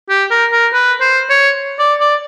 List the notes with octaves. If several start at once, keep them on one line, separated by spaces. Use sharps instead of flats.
G4
A#4
A#4
B4
C5
C#5
D5
D5